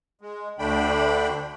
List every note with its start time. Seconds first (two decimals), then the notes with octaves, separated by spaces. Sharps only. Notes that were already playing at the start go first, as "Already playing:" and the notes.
0.21 G#3
0.59 D2 D3 A3 D4 G5 B5